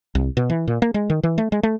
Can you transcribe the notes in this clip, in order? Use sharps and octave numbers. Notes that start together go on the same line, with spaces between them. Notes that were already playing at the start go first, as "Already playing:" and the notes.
C2
B2
E3
A#2
A#3
G#3
D#3
E3
A3
G#3
A3